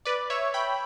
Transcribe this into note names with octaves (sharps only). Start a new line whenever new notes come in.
B4 D5
C#5 E5
G5 B5